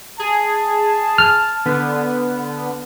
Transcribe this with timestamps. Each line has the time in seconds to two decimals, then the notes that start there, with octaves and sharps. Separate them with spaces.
0.19 G#4 A5
1.18 F6
1.66 D3 B3